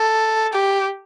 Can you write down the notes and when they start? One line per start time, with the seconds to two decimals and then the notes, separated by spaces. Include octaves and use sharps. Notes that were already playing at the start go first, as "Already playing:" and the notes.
Already playing: A4
0.53 G4